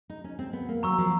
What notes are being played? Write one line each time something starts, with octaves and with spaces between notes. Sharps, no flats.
D#4
C#4
C4
B3
A#3
F#3 A#5 C#6 E6
F3